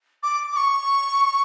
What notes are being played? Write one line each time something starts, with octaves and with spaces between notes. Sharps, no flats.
D6
D6
C#6